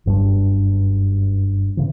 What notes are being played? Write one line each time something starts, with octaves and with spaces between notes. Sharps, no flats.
F#1 G2 G3 D4
G#2 C#3 E3